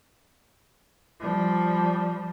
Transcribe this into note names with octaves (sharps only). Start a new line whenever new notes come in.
F3 G3